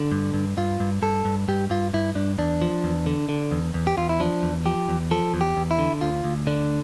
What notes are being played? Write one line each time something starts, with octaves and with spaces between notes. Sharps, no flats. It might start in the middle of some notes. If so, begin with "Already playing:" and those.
Already playing: D3
G2
G2
G2 F4
G2
G2 A4
G2
G2 G4
G2 F4
G2 E4
G2 D4
E2 D4
F3
E2
D3
D3
E2
E2
G4
E2 F4
E4
F3 D4
E2
F3 G4
E2
F3 A4
E2
G4
E2
E4
D3
D2 F4
D2
D3 D4